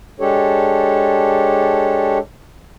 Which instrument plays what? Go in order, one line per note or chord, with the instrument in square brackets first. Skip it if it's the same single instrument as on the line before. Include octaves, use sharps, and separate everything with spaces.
[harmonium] G#3 D4 G4 A4 C#5